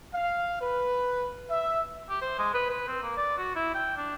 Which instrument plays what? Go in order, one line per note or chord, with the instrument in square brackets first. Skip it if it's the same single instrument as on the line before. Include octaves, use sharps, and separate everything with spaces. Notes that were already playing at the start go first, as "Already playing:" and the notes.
[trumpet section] F5
B4
E5
[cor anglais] G4
C5
G#3
B4
B4
C4
A#3
D5
F#4
E4
G5
D4